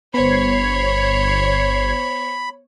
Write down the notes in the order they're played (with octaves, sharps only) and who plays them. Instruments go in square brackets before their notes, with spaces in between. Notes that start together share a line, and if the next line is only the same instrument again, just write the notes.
[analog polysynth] G1 G#6 C7 [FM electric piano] B3 C5 [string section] C#5 [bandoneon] B5